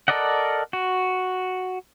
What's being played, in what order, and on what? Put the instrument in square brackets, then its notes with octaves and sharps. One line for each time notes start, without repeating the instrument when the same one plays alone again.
[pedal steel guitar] A4 A#4 D5 D#5 F#5
F#4